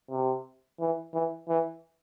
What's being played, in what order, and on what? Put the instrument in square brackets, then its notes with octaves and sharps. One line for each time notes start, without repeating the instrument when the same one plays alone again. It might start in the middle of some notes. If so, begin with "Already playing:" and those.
[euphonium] C3
E3
E3
E3